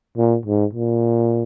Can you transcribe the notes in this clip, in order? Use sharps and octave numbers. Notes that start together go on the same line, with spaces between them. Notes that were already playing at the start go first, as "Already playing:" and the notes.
A#2
G#2
A#2